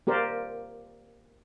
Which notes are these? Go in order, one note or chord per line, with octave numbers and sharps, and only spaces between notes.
A#3 G4 A#4 C5 D5